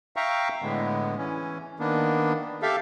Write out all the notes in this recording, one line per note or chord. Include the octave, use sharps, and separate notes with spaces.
E5 F5 G5 A#5 C#6
A2 D3 G#3 B3
E3 C#4
D#3 A#3 B3 D4
G4 A4 E5 F5